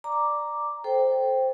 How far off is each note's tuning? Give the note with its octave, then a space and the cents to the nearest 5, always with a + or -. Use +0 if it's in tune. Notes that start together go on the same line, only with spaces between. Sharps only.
D5 +10 A#5 +0 D6 +0
A4 -20 C5 +0 G5 +0